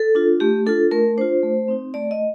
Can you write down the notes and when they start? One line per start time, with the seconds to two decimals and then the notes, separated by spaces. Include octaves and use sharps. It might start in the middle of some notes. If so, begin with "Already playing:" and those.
Already playing: A4
0.15 D4 F4
0.40 A3 G4
0.66 D4 F4 A4
0.91 A3 A#4
1.18 D4 F4 C5
1.43 A3
1.68 C4 D#4
1.94 A3 D5
2.11 D#5